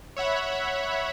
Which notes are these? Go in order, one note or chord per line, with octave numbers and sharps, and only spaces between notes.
C#5 E5 F#5 B5